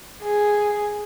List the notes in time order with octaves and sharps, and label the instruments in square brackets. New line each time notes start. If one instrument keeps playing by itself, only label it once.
[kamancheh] G#4